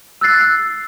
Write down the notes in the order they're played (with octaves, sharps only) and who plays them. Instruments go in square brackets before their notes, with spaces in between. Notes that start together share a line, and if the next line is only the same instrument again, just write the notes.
[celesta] E6 F#6 A6 C7